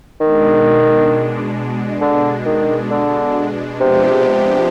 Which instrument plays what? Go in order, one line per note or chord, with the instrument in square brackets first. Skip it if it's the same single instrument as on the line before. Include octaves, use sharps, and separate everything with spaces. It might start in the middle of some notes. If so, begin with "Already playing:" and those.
[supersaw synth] B2 G#3 D4 [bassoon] D#3
[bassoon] D3
D#3
D3
[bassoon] C3 [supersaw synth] F3 G#3 B3 D4 G4